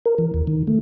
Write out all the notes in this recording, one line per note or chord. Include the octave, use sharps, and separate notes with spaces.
A#4
E3
D#2
D#3
A3